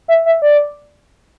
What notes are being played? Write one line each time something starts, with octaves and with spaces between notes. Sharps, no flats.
E5
E5
D5